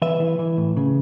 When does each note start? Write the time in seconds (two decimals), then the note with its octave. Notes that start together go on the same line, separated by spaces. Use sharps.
0.02 E3 B4 E5
0.20 E3
0.39 E3
0.57 A2
0.77 C#3